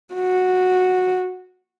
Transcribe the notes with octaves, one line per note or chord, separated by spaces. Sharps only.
F#4